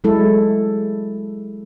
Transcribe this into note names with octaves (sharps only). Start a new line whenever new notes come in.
F#3 G#3 E4 A4